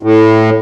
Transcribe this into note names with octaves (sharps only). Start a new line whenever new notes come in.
A2